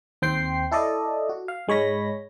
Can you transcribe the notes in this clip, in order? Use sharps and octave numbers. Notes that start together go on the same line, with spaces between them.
D#2 C4 G5 C6 C7
E4 A4 D5 D#5
F#4
F5
G#2 G#3 C#5 B5 A#6